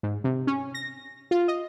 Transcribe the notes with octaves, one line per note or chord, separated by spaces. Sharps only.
G#2
C3
C#4
A#6
F4
D#5